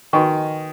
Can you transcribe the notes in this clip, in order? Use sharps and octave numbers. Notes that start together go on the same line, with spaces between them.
D#3 F#4 B4 D#5 G#5 C#6